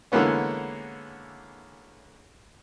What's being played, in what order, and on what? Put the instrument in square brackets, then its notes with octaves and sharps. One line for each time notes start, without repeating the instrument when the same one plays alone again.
[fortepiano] D3 E3 G#3 A#3 B3 C#4